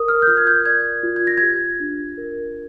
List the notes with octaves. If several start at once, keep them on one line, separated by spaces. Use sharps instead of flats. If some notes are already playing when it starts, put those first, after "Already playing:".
Already playing: A#4 D#6
F6
G6
F4 F6
G#6
G6
D5 G#6
F4
G#6
A#6
G4 G#6
D4
A#4